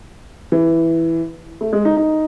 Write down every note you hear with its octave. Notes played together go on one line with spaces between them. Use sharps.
E3
A3
G#3
D#4
D#4